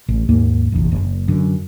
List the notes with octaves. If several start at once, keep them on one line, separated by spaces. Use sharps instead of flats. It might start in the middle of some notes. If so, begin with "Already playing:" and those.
A1
D#2 G#2 A#3
F1 A#1 E2
F#1
F#2 D3